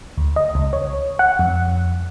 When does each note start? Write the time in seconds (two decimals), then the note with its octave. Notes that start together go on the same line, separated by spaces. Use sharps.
0.17 D2
0.36 D#5
0.55 C#2
0.73 C#5
1.19 F#5
1.39 F2